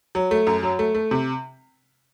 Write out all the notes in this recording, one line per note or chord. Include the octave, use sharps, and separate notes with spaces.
F#3
A3
F#2
F#3
A3
A3
C3